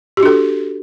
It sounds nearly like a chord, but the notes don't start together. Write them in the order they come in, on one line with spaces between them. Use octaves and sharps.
G4 F#4 D4 A4